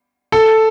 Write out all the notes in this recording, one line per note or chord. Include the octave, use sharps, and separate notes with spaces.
A4